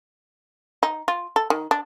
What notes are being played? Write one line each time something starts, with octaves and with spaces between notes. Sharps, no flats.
D#4
F4
A4
D#3
D4